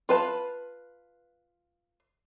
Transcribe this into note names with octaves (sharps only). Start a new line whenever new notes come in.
F4 B4 A5